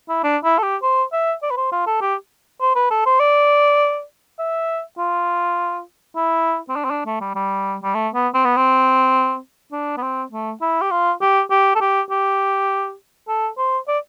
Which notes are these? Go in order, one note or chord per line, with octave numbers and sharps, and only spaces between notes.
E4
D4
E4
A4
G4
C5
E5
D5
B4
C5
F4
A4
G4
C5
B4
A4
C5
D5
E5
F4
E4
C4
D4
C4
D4
A3
G3
G3
G3
A3
B3
C4
B3
C4
D4
B3
C4
A3
E4
G4
F4
G4
G4
A4
G4
G4
A4
C5
D5